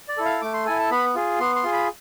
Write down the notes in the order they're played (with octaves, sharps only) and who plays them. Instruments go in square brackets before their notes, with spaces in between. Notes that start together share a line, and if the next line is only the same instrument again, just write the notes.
[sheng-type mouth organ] D5
E4 A4
F5
A3 D6
C6
E4 A4 G#5
A5
B3 B5
F4 G#4
B3 C6
C6
F4 G#4
B5